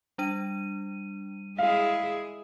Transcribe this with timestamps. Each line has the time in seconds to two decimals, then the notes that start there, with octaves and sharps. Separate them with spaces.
0.18 G3 D4 D#7
1.58 G#3 E4 G#4 F5